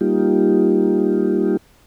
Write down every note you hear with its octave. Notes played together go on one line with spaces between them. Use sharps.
G3 A#3 D#4 F4 G4